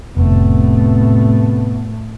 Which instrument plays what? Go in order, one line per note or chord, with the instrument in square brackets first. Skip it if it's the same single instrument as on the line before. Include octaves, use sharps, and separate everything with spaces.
[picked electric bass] F1 [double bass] A2 A3 [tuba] C3 [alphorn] B3